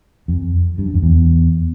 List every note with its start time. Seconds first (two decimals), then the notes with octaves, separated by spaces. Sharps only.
0.28 F2
0.78 G2
0.86 F#2
0.94 F2
1.02 E2